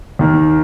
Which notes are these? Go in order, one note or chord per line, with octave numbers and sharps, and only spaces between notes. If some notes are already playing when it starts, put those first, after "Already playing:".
D#2 D#3 A#3